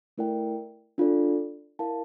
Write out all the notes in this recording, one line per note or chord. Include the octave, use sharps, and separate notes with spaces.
A3 E4 A#4 D5 G5
D4 F4 A4 D5
E4 A#4 F5 A5